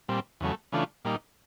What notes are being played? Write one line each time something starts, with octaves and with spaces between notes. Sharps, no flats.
A#2 G3 C4
E2 C#3 F#3 A3
C#3 E3 A3 D4 F4
A#2 G3 A#3 D#4